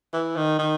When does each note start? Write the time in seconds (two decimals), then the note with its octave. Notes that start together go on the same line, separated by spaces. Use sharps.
0.13 E3
0.37 D#3
0.59 D#3